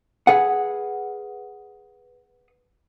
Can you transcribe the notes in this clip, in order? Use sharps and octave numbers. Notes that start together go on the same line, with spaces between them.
G#4 B4 F#5